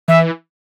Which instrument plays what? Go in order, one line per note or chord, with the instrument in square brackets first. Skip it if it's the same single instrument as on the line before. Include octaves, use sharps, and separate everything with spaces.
[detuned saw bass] E3 [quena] E5